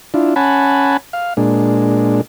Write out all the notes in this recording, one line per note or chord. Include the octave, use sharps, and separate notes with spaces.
D4 E4 F4
C#4 F#5 G#5 A5 B5
F5
A#2 G#3 D4